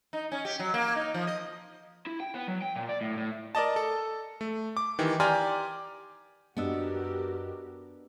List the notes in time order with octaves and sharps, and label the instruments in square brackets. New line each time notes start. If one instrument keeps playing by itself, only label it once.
[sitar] D#4
C#4
G4
F#3
A#3
D#4
F3
D#5
[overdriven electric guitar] E4
G5
B3
F#3
G5
A#2
D5
A2
A2
[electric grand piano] A#4 D5 D#5 A5
A4
A3
D6
D#3 E3 G4
G4 D5 G#5 A#5 C6 F6
[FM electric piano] F#2 D#5 E6 [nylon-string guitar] B3 D4 [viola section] F#4 G4 A#4